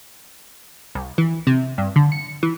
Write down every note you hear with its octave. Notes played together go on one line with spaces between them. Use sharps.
C2
E3
C3
G2
D3
C#7
E3